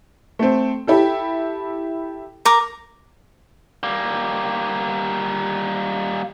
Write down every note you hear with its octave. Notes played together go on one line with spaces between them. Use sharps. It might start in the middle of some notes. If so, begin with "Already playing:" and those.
A3 C4
E4 G4 A4
A#4 D6
G3 A#3